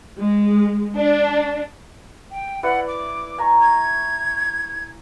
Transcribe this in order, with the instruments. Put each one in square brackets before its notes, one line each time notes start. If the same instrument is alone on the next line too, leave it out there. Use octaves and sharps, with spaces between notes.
[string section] G#3
D4
[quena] G5
[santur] E4 B4 D5 [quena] F#5
[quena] D6
[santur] G#5 A#5 C#6
[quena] G#6